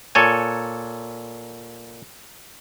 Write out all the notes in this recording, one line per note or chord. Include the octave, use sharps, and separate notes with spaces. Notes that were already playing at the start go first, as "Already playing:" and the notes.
A#2 A4 C#5 G#5